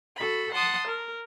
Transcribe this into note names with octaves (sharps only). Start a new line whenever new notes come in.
F#4 A4 B5
F#5 A5 C6 D#6
A#4